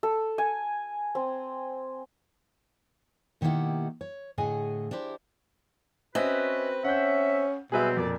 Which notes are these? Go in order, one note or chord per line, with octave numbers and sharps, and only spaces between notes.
A4
G#5
C4
B2 D#3 A#3 E4 G4 F#5
C#5
A2 D3 G#4 D#5 G#5
D4 E4 G4 C5
C4 C#4 F#4 B4 D#5 E5
C#4 E5 F#5 G6
B2 F#3 G3 C4 G#4 B4 E5
F2 A#2 D5